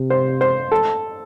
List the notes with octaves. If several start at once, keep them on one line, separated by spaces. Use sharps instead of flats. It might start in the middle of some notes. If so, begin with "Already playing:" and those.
Already playing: C3
C5
C5
A4